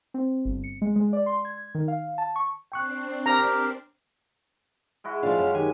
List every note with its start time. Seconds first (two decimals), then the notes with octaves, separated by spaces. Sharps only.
0.14 C4
0.45 G1
0.64 C#7
0.82 G#3
0.96 G#3
1.13 D5
1.26 C6
1.45 G#6
1.75 D#3
1.88 F5
2.18 A5
2.36 C#6
2.72 C4 D4 G5 C#6 F#6 C7
3.26 G4 A#4 A#5
5.04 G#3 E4 F#4
5.23 F3 D4 F4 G#4 F5
5.38 F#2
5.55 D#3 G4 G#5